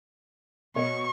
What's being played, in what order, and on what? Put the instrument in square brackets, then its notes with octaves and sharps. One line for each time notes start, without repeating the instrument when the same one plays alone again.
[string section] B2 [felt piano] C#5 D#5 [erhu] C#6